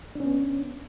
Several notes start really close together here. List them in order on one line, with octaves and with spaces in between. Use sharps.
D4 C#4 B3